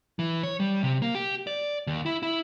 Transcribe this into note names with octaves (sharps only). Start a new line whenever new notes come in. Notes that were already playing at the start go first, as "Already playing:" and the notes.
E3
C#5
G3
C3
A#3
G4
D5
D#2
E4
E4